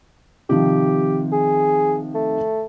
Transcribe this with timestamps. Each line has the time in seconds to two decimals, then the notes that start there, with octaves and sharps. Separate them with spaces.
0.49 C3 D#3 F3 G4
1.32 G#4
2.15 A3